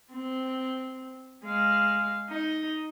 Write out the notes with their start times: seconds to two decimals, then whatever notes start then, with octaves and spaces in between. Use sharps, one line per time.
0.13 C4
1.45 G#3 F5
2.30 D#4